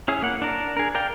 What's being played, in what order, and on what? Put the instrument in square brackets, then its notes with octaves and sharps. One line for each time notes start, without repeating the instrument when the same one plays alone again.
[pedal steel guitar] C#4 E4 G#4
A#3 F#5
D4 A#4
G#4 A#4
A#4 D5 F5 G5